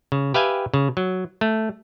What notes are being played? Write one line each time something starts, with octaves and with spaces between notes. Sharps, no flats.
C#3
G4 B4 E5 F5 G5 G#5
C#3
F#3
A3